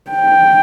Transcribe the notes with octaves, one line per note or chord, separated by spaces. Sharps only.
G5